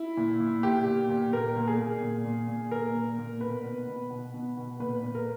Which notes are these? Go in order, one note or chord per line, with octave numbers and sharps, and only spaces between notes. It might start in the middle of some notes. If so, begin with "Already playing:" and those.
Already playing: E4
A#2
A#2
A#2 G4
A#2
A#2
A#2 A#4
A#2
G#4
A#2
A#2
A#2
A#2
A#2 A#4
A#2
A#2
B2 B4
B2
B2
B2
B2
B2
A#2 B4
A#2
A#4